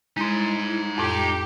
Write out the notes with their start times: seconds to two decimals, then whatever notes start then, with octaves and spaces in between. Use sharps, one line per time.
0.17 G#3 D#4 E4 C6
0.98 F2 A2 G4